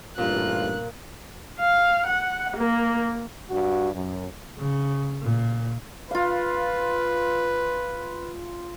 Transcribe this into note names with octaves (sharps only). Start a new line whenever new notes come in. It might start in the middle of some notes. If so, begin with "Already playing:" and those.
A1 G2 A#2 F4 F#6
F5
F#5
A#3
G2 F#4
F#2
C#3
A#2
F4 B4 F5